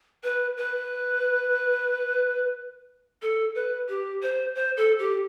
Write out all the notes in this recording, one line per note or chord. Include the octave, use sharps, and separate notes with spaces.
B4
B4
A4
B4
G4
C5
C5
A4
G4